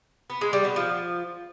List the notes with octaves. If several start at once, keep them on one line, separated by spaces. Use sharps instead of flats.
B3
G#3
G3
B2
F3